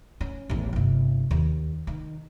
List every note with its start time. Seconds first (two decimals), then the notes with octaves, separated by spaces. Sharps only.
0.21 C#4
0.50 A1 E2
0.73 G1 C3
1.31 D#2
1.87 D#3